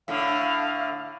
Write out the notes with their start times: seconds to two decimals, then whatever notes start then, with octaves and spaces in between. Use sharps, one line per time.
0.08 A2 D3 F5